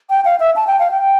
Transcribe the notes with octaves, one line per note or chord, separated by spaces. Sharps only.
G5
F5
E5
A5
G5
F5
G5